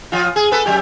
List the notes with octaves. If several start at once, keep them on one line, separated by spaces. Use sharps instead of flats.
F3 F4
G#4
B3 A4 B4
F#2 F#3 G4